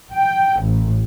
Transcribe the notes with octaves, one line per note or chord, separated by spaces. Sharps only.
G5
A1